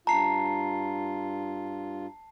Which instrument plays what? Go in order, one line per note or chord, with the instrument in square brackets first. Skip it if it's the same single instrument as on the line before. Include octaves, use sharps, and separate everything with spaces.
[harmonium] G2 F4 [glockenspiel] A5 C7 [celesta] A#5